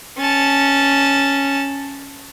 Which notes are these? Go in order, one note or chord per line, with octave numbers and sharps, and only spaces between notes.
C#4 A5